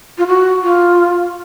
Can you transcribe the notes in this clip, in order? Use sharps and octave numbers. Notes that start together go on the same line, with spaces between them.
F4
F#4
F4